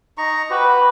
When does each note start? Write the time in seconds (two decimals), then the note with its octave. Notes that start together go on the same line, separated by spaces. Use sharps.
0.18 D#4 A#5 C#6
0.50 F#4 G4 B4